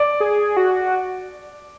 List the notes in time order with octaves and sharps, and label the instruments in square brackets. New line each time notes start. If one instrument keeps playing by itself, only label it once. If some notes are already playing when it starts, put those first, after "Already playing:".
Already playing: [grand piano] D5
[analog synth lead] G#4
F#4